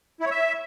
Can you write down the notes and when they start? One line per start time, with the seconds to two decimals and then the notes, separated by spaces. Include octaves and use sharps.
0.20 E4
0.25 C#5
0.31 E5